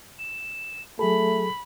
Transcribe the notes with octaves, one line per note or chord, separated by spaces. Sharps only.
E7
F#3 A3 G#4 A4 B5